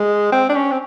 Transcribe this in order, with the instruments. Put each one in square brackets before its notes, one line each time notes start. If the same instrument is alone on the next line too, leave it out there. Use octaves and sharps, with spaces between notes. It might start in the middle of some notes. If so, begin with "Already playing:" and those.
Already playing: [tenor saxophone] G#3
C4
D4
C#4
C4